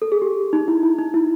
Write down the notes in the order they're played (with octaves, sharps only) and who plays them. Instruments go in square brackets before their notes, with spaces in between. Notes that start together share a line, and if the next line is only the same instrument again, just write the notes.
[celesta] A4
G#4
G4
D#4
E4
E4
D#4
E4